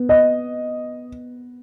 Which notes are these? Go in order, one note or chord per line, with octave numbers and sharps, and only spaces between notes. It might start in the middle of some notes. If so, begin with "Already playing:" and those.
Already playing: B3
D#5